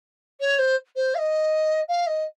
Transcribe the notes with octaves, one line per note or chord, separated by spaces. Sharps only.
C#5
C5
C5
F5
D#5
F5
D#5